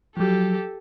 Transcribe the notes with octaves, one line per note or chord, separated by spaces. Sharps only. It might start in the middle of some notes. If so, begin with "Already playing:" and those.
F3 F#3 G4 A4